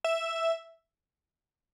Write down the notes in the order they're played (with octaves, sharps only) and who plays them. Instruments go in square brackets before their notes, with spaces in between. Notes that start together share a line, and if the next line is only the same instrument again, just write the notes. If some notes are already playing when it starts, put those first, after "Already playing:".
[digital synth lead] E5